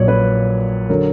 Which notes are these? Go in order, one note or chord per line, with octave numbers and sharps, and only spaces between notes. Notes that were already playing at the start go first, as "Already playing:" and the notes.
Already playing: A#1 A#2 F#3 C#5 D5
B4
D3 F#3 A#4